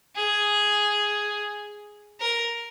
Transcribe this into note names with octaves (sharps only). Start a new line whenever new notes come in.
G#4
A#4